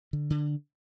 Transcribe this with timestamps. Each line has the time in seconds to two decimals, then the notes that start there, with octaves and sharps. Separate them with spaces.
0.13 D3
0.30 D3